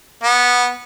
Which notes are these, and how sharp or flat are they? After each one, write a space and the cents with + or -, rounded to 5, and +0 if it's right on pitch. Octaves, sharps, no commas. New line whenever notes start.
B3 -10